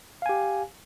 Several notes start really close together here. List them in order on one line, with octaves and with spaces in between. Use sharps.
F5 G#5 G4